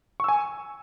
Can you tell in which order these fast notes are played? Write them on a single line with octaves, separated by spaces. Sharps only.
C#6 E6 G#5